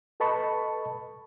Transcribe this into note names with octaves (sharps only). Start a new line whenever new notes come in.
A4 B4 D#5 A5 B5 C#6